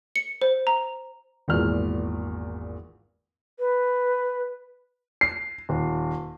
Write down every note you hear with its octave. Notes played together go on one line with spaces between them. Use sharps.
C#7
C5
A#5
G#1 E2 A#2 F6
B4
C7
D#1